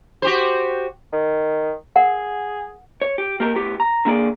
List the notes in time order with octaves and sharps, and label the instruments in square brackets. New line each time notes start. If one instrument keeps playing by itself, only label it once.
[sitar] F#4 G4 C5
[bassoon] D#3
[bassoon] G#4 [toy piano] A#4 F#5
[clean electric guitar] C#5
G4
A#3 G4 A#4
A2 B3 G4
A#5
D3 A#3 G#4 D5